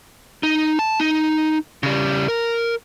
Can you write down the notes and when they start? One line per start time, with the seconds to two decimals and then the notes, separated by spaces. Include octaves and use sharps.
0.43 D#4
0.79 A5
1.00 D#4
1.83 C#3 G3
2.28 A#4